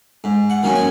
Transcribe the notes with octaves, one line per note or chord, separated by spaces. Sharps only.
G#2
F#5
D#3 F#3 A#3 C#4
G#5